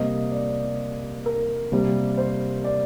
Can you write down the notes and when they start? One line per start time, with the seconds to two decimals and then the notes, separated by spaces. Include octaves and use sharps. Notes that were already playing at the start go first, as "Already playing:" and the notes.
Already playing: C3 G3 A#3 D#5
0.32 D5
1.26 A#4
1.72 C3 G3 A#3
2.18 C5
2.64 D5